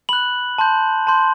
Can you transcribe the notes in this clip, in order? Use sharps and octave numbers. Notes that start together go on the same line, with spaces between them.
B5 F#6 F#7
A5 C6 G6
A5 C6 G6